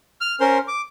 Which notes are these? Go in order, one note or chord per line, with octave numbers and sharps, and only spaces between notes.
F6
C#4 A#4 C5 C6
D6